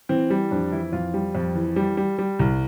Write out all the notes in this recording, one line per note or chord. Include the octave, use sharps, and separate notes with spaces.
E3 C4
G3
F2 D4
E3 E4
F2 F4
G3
F2
E3
G3
G3
G3
C2